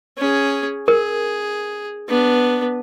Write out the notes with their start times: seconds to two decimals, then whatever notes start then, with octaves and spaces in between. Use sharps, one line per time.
0.18 C#4 G#4
0.88 G#4 A#4
2.08 B3 D4